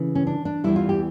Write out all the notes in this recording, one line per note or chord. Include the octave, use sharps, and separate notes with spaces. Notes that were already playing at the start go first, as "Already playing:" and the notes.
Already playing: C#3 E3 A3
C#4
D4
D4
E2 E3 G3 E4
F4
G4